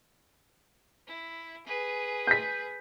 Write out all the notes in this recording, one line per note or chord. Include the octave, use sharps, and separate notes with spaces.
E4
G#4 B4
G6 B6